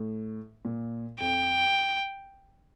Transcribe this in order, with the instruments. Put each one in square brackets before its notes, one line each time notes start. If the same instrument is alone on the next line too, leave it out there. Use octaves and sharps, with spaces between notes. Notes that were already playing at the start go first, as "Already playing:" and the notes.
Already playing: [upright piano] A2
A#2
[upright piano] F2 [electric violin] G5